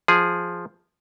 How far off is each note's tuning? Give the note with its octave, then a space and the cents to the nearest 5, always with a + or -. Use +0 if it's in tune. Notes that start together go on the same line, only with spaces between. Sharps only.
F3 +0 G#4 +0